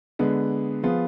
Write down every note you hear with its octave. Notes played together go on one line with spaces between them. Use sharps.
D3 G#3 B3
F3 B3 F4 G#4